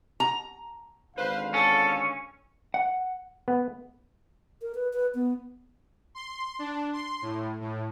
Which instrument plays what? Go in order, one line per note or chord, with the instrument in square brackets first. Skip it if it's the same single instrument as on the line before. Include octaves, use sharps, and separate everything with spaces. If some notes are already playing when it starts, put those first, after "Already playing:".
[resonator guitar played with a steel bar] A#5
[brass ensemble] G#1 D3 F5 [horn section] B4 C5
[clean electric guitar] C#4 [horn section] A4
[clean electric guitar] F#5
[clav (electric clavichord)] B3
[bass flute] A#4
B4
B4
B3
[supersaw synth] C6
D4
C6
A2
A2